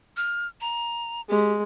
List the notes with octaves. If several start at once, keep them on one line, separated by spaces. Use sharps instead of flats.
F6
A#5
G#3 G4